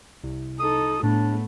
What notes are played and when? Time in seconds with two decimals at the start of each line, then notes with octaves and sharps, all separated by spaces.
0.24 C2
0.60 D#4 A4 D#6
1.03 A2 A3 B3 D4